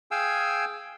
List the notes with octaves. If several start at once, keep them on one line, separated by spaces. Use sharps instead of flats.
G#4 F5 G5 G#5 E6